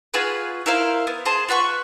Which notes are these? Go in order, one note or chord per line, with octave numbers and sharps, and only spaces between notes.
F4 F#4 G#4 B4
E4 A#4 C5 F5
B3
G#4 C5 A5
F4 B4 F#5 C#6